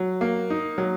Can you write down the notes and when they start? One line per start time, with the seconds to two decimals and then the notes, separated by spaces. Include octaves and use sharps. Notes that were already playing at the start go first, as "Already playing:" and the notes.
Already playing: F#3
0.21 A#3
0.50 D#4
0.78 F#3